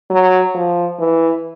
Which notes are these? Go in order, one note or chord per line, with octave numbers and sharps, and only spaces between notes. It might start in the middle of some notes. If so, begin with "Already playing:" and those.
F#3
F3
E3